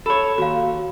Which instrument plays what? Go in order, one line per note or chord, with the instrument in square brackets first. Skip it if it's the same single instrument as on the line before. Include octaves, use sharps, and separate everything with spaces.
[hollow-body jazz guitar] A4 C#5 [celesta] B5
[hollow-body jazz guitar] D#2 [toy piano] F#4 F5